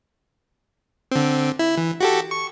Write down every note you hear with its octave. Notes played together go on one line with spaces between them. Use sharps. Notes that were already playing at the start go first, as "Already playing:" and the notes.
D3 C4
E4
E3
F#4 G4 A4
C#6